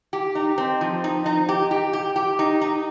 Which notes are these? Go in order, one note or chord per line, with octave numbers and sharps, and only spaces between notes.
G4
D#4
C4
F3
D#4
D#4
G4
G4
G4
G4
D#4
D#4